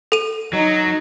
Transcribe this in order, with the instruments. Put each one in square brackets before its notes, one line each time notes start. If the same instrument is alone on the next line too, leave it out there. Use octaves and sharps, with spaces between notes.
[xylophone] A4 D#7
[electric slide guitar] F#3 [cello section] D#4